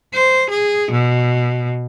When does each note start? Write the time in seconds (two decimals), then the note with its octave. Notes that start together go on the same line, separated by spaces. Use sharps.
0.14 C5
0.50 G#4
0.91 B2